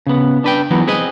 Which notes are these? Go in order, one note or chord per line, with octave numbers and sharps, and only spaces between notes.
C#3 B3
D4 B4 G5
E3 F#3 B3 F#4
C4 G#4 B4 D#5